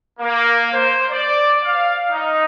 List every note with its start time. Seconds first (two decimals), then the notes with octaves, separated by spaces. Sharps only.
0.19 A#3
0.73 C5
1.11 D5
1.64 F5
2.11 D#4